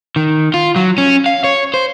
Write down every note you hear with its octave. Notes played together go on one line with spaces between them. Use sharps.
D#3
F4
F#3
C#4
F5
C#5
C5